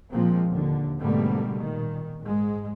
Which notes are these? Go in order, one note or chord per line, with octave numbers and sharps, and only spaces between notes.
A#2 F3 G#3 A#3 C4
D#2 D3
G#2 B2 D3 G3 A3 A#3
A#2 D#3
G#2 G#3